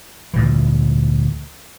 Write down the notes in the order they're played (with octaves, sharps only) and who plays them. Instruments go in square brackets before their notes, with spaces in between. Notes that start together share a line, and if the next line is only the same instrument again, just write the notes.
[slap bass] D2 A#2 E3